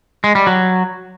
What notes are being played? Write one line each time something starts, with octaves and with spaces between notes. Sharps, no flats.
G#3
G3
F#3